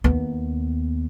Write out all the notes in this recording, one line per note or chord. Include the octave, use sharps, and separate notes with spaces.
D#2 B3